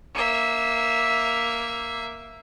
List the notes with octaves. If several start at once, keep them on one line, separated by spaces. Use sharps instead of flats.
A#3 E5